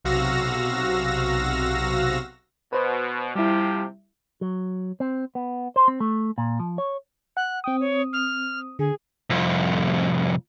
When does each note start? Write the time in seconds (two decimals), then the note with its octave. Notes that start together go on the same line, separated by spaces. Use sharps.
0.05 B1 C3 F#4 F5 E6 A#6
2.73 B2 B4 C5
3.35 C3 F3 G3 E4 G4
4.41 F#3
5.00 C4
5.35 B3
5.76 C5
5.88 C4
6.00 A3
6.38 A#2
6.59 F3
6.78 C#5
7.37 F#5 F#6
7.64 C4 G5 D#6
7.80 C#5
8.13 F6
8.79 D3 G#4
9.30 C2 F2